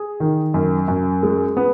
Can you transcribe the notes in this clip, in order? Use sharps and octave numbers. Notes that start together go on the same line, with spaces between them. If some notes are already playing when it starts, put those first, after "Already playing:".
Already playing: G#4
D#3
F#2
F#2
G#3
B3